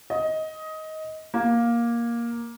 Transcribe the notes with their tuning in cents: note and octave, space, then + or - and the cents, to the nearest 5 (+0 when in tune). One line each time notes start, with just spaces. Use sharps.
D#5 +15
A#3 +10